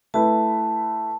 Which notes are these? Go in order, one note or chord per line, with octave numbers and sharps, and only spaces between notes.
A3 E4 B4 A5